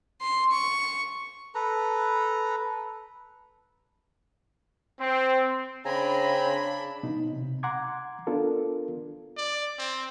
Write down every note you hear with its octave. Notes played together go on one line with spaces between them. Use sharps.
C6
C#6
A4 B4 A#5
C4
C#3 C4 D4 G#5 A#5 B5
B2 D#4
C3
F#5 A#5 C6 D6 G#6
B3 D4 F4 A4 A#4
D5
C4